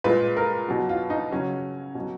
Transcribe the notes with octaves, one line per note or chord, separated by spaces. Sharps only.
A#2 G#3 B4
A#4
B2 F#3
F4
D#4
C#3 F#3 C#4
B2 F#3